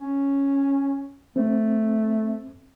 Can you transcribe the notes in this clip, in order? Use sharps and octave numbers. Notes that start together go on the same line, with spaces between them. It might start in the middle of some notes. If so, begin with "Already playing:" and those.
C#4
A3 C4